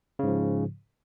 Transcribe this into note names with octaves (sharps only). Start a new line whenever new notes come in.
G#2 C#3 F3